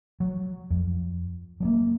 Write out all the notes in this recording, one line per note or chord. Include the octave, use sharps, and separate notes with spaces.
F#3
F2
F#3 G#3 A#3